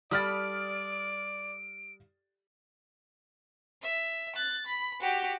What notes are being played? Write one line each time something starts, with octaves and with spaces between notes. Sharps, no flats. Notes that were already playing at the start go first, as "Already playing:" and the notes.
G3 A4 D5 B5 D#6 F6 A6 D7
E5
F#6 A6
B5
F#4 G4